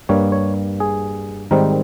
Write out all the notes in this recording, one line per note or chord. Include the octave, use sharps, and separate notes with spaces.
G2 G3 A#3 C#5
C#5
G#4
G#2 D#3 G3 C4 A#4